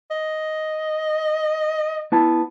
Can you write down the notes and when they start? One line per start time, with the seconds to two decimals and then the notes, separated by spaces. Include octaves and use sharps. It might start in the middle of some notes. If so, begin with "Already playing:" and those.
0.11 D#5
2.12 B3 E4 A5